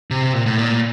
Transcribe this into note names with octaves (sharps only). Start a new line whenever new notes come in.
C3
A#2
A2
A#2